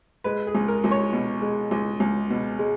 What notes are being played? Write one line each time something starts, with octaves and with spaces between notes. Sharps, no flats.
G#3 B4
G#4
C#2
A#4
C#2
C#5
B2
G#3
C#2
C#2
B2
G#3